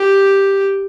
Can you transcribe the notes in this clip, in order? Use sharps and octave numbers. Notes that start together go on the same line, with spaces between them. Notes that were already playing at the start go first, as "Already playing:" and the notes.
Already playing: G4